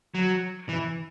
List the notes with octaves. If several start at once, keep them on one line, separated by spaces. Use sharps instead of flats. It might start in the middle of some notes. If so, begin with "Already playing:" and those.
F#3
E3